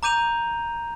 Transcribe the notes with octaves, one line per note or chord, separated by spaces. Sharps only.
A#5 D6 G6 D#7 F7